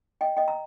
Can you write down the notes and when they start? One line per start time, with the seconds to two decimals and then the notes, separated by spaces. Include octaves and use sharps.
0.21 D#5 G5
0.37 D#5 G5
0.48 A#5